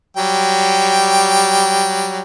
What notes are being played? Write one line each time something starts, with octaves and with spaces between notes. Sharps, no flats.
F#3 G3 G5